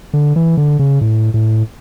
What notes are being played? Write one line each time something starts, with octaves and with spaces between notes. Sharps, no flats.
D3
E3
D3
C#3
A2
A2